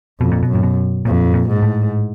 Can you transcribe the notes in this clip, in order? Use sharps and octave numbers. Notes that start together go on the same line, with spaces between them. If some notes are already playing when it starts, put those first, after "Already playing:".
F2 B2
A#2
B2
F#2
A#2
B2
F2 A#2
A#2
G#2
A2